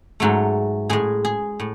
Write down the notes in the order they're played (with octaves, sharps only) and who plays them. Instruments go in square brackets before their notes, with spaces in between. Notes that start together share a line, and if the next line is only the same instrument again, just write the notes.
[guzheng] G#2 F#3 A3
A2 G#3 G#4
G#4
A2